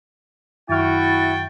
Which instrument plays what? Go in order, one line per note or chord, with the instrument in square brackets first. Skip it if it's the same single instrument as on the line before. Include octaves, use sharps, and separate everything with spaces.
[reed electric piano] F#2 D#3 F6 [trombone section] E4 [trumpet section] F#4 G5 C#6 [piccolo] A6